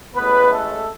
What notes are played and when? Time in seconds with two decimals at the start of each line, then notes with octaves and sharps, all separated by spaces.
0.15 A1 A2 G#3 B3 B4
0.52 A3 A4